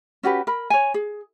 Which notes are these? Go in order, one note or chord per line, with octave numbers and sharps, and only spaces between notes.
C#4 F#4 G4 B4
A#4 B5
C#5 G#5
G#4